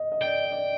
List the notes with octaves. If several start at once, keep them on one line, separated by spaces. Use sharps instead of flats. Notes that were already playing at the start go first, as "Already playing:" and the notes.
Already playing: D#5
D#5
D5 G5
D#5
D5